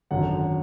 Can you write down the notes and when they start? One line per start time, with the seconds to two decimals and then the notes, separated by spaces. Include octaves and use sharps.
0.11 G#1 F#2 D3 F#5